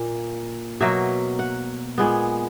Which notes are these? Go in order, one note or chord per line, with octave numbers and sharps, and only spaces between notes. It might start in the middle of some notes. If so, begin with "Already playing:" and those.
Already playing: A#2 A#3
B2 F#3 A#3 E5
F#5
A#2 G#3 B3